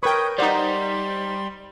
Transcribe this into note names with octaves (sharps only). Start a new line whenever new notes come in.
A#4 B4 C#5 G5 C#6 D#6
G3 D#4 C5 D5 F#5 C6